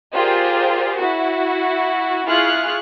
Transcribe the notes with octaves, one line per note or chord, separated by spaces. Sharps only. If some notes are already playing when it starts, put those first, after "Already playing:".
F4 G4 G#4 A#4 C5 D5
E4 F#4
E4 F4 G#4 C#6 F6 F#6